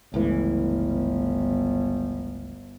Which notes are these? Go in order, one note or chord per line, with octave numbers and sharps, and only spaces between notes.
G1 C#2 A2 E3